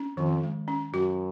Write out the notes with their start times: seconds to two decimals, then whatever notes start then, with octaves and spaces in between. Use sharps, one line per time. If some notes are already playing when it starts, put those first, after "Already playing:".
Already playing: C#4
0.17 F2 D#3
0.43 G#3
0.68 C#4
0.93 F#2 F#4